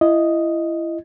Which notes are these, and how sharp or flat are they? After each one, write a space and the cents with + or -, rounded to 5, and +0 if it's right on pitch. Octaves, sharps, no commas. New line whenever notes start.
E4 +30 D#5 +0